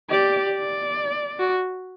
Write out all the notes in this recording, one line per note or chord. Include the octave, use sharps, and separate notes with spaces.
G4 D5
D5
F#4